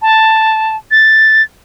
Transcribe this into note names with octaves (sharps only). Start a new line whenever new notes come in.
A5
A6